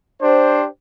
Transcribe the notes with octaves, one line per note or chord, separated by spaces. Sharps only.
D4 G4 C5